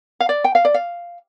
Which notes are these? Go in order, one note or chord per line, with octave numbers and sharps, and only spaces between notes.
F5
D5
G5
F5
D5
F5